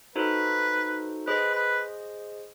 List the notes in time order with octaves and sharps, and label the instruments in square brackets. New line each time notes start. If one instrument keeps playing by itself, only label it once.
[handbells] D#4 F#4 A4 C5 [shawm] B4
[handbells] G#4 C5 D#5 [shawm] B4
[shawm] B4